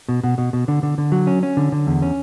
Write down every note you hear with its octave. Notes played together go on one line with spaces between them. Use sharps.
B2
B2
B2
B2
D3
D3
D3
F#3
C#4
C#4
D3
D3
E2
C#4